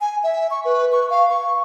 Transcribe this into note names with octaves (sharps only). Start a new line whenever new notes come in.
G#5
E5
C#6
B4
C#6
F5
C#6